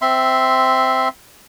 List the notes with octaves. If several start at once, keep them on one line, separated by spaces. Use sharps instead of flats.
C4 E5 C6